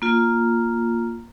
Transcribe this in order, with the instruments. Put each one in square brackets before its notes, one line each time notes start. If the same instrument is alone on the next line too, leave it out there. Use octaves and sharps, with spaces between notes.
[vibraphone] A#3 F4